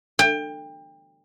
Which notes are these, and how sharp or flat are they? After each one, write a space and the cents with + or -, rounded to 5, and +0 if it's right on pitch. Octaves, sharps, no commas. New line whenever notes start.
G5 +25